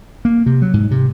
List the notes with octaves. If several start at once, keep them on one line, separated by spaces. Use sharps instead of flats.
A#3
C3
F#3
G#2
C3